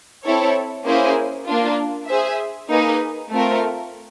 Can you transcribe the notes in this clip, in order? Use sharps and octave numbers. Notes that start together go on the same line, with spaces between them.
C4 E4 A4 C#5
A#3 C#4 E4 G#4 C5
A#3 D4 F4
G#4 C5 E5
A#3 D#4 G#4 B4 D#5
A3 C4 F4 A#4